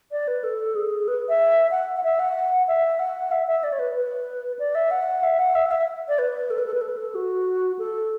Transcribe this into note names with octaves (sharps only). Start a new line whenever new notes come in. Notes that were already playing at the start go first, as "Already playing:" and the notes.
D5
B4
A4
G#4
B4
E5
F#5
F#5
E5
F#5
E5
F#5
E5
E5
D5
C#5
B4
B4
D5
E5
F#5
E5
F#5
E5
F#5
E5
D5
B4
A4
B4
A4
B4
A4
B4
A4
F#4
A4